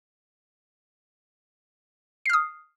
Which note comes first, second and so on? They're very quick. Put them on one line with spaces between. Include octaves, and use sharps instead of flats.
C7 F6 D#6